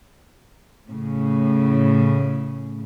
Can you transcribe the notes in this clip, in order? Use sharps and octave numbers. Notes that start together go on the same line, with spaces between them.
A2 C#3